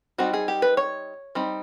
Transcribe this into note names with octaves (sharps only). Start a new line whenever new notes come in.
G3 C4 D#4 F#4
G#4
G4
B4
C#5
G3 C4 D#4